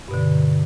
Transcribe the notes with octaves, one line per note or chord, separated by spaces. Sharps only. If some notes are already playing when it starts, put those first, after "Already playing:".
G2 B2 D3